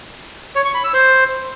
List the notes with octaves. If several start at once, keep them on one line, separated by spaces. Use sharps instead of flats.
C#5
C#6
B5
E6
C5